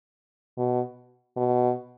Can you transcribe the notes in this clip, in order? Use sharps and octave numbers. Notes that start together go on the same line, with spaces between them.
B2
B2